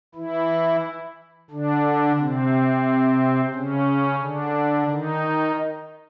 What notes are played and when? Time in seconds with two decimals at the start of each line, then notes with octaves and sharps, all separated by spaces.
0.15 E3 E4
1.51 D3 D4
2.19 C3 C4
3.54 C#3 C#4
4.22 D3 D4
4.91 D#3 D#4